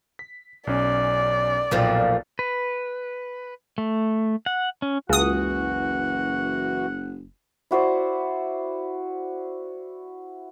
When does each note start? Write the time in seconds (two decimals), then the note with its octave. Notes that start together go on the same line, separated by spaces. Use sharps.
0.19 B6
0.67 B1 C#4 D5
1.71 B1 F2 A#2 F3 F5 A6
2.39 B4
3.78 A3
4.46 F#5
4.82 C#4
5.09 F#1 C#2 E3 F#4 F#5 D#6
7.71 E4 F#4 C5 D5